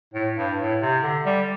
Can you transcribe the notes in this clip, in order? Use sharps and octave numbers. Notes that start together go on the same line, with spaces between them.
A2
G2
A2
C3
D3
G3